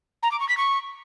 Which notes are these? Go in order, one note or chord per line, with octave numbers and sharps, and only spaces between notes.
A#5
D6
C#6
B6
C#6